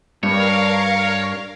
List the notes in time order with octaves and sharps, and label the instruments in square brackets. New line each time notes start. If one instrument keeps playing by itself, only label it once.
[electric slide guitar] G2 [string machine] A#4 F5 [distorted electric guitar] C#5